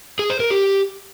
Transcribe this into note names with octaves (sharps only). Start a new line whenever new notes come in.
G#4
C5
A#4
G4